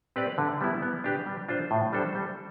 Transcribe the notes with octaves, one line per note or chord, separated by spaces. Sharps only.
C4 G4 B4 D5
D3
G3 B3 E4
B3
D4 G4 B4
G3
D4 F4 C5
A2
G3 D4 A4 C5
G3